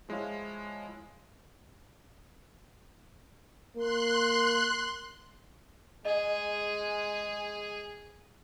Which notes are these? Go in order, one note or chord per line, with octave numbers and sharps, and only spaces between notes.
F3 G#3 E4 C#5 F5
A#3 C6 F#6
G#3 G#4 D#5